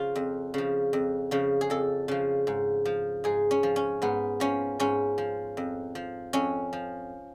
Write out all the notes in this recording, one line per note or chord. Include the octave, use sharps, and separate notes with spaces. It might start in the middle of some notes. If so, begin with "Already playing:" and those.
Already playing: C#3 F3 F4
F2
C#3 F3
F2
C#3 F3
G#4
F2 A4
C#3 F3
G#2
F3
G#2 G#4
C#4
F3
C#4
G#2 B3
F3 C#4
G#2 C#4
F3
F2
F3
F2 C#4
F3